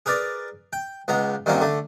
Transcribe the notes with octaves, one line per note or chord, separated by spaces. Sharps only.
G#4 A#4 B4 D5
G5
C#2 G#3 B3 A#5
G2 A#2 D#3 F#3 C4 C#4
D3 A3